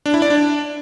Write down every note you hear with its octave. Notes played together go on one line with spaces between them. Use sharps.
D4
E4
D5
D4